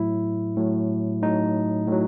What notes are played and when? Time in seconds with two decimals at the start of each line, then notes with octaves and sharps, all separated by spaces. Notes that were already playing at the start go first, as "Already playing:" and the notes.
Already playing: A2 F#3 E4
0.57 A2 F#3
1.22 A2 F#3 D#4
1.88 A2 F#3